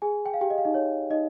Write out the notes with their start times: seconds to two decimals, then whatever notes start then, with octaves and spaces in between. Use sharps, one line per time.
0.02 G#4 G#5
0.26 G5
0.34 F5
0.41 G4 G5
0.50 D#5
0.58 F5
0.65 D#4 D#5
0.74 C#5
1.10 D#4 D#5